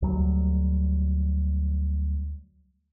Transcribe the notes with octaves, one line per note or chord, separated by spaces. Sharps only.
D2 F#3 G3